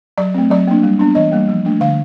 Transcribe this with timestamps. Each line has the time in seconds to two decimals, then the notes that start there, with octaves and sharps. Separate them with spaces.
0.18 F#3 D5
0.34 A3 C4
0.51 F#3 D5
0.67 A#3 D4
0.83 G3
0.99 B3 D4
1.15 E3 D#5
1.31 G3 A#3
1.48 F3
1.65 A3 D4
1.81 D3 F5